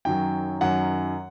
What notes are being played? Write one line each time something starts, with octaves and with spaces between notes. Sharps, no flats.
F#2 D#3 F#3 G5
F#2 D#3 F#3 F#5